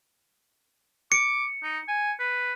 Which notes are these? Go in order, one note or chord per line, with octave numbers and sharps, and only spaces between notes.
D6 C#7
D#4
G#5
B4